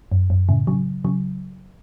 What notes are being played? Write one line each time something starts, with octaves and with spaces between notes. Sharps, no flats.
F#2
F#2
A2 C#3
C#3 F#3
C#3 F#3